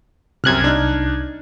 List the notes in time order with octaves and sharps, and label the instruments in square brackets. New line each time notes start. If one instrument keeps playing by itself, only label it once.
[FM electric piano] C2 F#6 G#6 [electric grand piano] F#2 C3 F6
[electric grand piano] D4 D#4